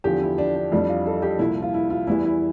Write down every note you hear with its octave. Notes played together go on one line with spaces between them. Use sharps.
E2 D3 F3 G4
E4
D4
D4
F2 E3 G3 D4
F4
A4
G4
C2 A#2 F3 E4
F4
E4
F4
E2 E3 G3 E4
E4